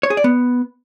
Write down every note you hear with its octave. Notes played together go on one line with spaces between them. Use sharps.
C#5
G#4
D5
B3